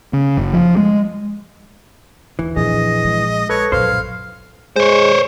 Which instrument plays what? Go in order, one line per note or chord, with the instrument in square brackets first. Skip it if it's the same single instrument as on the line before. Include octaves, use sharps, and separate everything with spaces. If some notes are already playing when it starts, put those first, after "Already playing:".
[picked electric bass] C#3
F#1
F3
G#3
[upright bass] D#2 [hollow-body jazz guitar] E3
[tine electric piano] A#1 G#4 [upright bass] F2 D3 [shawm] D#5
[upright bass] G#3
[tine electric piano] A4 B4 [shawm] C#5
[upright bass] A#1 F#2 [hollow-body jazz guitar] C5 [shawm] F5
[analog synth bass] G#3 [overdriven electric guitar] C5 C#5